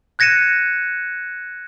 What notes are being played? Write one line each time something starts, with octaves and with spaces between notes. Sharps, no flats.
F#6 G#6 A#6 C#7 D#7 E7